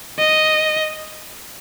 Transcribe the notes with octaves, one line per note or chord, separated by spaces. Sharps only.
D#5